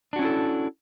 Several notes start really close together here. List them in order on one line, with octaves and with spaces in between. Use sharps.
D4 F#4 C#4 E4 A4